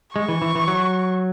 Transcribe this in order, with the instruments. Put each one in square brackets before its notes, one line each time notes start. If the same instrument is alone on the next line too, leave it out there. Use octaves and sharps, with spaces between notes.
[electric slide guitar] G#3 [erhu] C#6
[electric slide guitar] E3
E3
E3
F#3